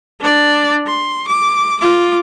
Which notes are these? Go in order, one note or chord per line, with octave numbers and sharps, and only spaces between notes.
D4 D5
C6
D6
F4 D6